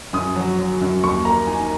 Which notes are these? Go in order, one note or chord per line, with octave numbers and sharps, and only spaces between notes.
F#2 D#6
F#3
F#3
F#2
D#2 C#6
A#3 A#5
D#4 G#5